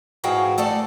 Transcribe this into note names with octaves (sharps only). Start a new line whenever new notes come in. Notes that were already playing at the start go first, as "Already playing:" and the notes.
G#2 E3 F#4 G#4 F5 G5
A3 A4 D5 A5